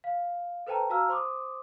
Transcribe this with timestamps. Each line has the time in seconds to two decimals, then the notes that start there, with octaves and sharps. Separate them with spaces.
0.04 F5
0.67 A4 B4 C5 G5 A5 A#5
0.90 F#4 F5 A5 A#5 E6 F6
1.09 C5 C6 D6 D#6